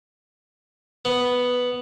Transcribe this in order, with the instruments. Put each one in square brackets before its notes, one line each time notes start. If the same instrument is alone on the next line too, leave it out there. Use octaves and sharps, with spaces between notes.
[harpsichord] B3